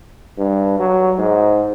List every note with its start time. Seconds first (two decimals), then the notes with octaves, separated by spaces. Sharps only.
0.38 G2
0.79 F#3
1.18 G#2